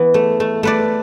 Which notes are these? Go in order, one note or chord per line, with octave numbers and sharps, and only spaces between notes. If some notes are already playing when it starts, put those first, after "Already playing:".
Already playing: E3 B3
A3
A3
A3 B4 D5